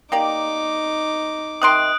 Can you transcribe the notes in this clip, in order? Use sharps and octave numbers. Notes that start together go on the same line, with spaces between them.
A#3 D#4 G4 D5 D6
C3 D#3 C6 D#6 F#6 D7